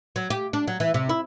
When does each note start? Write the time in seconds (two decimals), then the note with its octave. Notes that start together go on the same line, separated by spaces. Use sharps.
0.16 F#3
0.30 G4
0.53 D4
0.67 F#3
0.80 E3
0.94 C3
1.09 E4